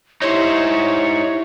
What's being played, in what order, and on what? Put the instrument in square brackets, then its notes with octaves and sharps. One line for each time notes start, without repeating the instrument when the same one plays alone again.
[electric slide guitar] D#4 C5 [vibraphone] E4 G4 E5 [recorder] C#5